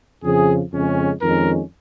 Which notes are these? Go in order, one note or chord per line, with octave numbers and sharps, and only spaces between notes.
F2 C#3 F3 G#4
F2 C#3 G#3 C#4
F2 D#3 G#3 C#4 A#4